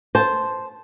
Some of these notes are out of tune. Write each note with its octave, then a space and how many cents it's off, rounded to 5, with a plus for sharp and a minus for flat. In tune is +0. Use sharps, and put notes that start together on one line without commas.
C5 +0 A5 -15